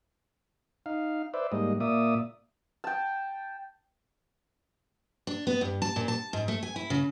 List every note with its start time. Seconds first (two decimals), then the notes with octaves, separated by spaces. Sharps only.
0.86 D#4 F5
1.34 B4 C5 D5 E5
1.52 G#2 G3 G#3 A#3 D#5
1.80 A#2 A#3 D5 E5 D#6
2.84 G5 A5
5.27 D4
5.47 B3
5.61 G2
5.82 A5
5.96 A#2
6.08 A5
6.33 G#2
6.48 A3
6.63 G#5
6.76 E4
6.90 C#3